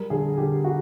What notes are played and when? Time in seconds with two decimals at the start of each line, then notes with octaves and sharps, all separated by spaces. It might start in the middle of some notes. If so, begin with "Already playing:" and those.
Already playing: G3 A#4
0.10 D3 G#4
0.37 D3 G4
0.64 F#4